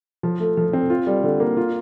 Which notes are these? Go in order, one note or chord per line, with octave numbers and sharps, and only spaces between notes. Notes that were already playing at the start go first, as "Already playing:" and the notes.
F3
A3
F3
C4
F4
G3
D3
A#3
F4